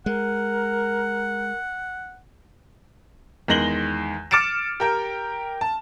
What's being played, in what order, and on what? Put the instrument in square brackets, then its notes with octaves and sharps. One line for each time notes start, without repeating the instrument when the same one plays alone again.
[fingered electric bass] G#3 [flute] A#4 [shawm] F#5
[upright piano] E2 D#3 G#3 A#6 F#7 G7
D6 F6 A6 C#7 D7 E7
G4 A#4 G5
A5